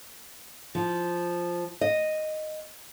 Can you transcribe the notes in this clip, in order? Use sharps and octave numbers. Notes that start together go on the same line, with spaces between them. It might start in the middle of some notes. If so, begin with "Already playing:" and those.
F3
D#5